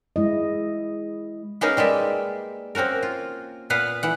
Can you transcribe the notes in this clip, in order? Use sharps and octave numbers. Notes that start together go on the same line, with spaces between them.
G#3 E4 D#5
A#3 B3 C#4 D#4 G#4 A#4
G3 G#3 D5 E5
A#3 C4 C#4 F#4 A#4
F4
A#2 B3 B4 F5 F#5
E3 F#5